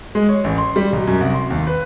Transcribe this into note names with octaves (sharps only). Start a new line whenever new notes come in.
G#3
C#5
A1
C6
G3
B1
F#2
C2
C6
D#2
B4